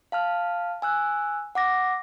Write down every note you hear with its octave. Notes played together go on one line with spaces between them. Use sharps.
F5 A5 F6
G#5 E6 F#6
F#5 D6 A#6